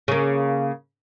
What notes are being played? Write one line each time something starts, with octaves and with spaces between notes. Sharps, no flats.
C#3 A#3